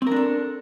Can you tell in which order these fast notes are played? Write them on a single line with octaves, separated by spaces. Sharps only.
C4 A#4 D4 A4